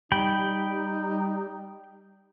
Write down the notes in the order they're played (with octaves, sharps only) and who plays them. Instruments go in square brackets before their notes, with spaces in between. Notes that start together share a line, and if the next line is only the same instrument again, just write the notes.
[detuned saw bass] G3 [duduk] D#4 [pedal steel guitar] G5 B5